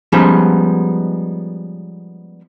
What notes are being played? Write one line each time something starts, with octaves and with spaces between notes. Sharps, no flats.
F3 G3 G#3 B3 C#4 D#4